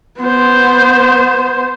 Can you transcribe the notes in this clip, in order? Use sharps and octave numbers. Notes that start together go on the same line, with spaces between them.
B3 C5